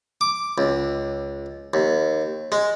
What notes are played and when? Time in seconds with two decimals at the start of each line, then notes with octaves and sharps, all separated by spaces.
0.21 D6
0.58 C#2
1.74 D#2
2.52 G#3